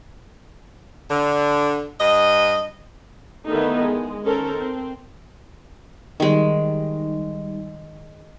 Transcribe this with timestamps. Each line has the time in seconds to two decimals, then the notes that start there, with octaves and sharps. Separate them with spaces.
1.10 D3
2.00 G2 D#5
3.48 D3 D#3 A3 B3 D#4 E4
3.81 G#3
4.26 D#3 C#4 A4 A#4 C5
4.56 C4
6.20 D#3 G3 G#3 D#4